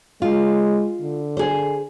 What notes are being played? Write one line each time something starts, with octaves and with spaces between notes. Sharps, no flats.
G#3 F4
D3
G#4 C5